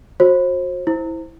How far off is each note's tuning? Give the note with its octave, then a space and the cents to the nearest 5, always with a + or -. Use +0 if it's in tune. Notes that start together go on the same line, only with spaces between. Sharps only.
F#4 -25 C5 +30
E4 -10 C5 +0